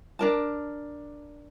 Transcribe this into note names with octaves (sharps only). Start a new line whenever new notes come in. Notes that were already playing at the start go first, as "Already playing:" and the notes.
D4 A#4 A5